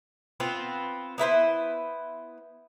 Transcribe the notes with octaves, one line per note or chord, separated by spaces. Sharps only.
B3 C4 F4 B4
B3 E4 B4 C5